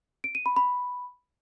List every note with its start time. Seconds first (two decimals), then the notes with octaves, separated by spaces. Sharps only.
0.24 D7
0.35 D#7
0.46 B5
0.56 B5